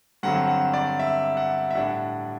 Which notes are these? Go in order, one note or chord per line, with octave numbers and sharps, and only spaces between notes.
G2 D3 F#3 C4 F#5
F#5
D5
E5
F#5
E5
A2 G3 D4 F#5